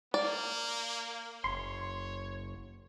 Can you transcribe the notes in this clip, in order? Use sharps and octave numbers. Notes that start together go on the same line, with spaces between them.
A#3 D5
F#1 C#5 C6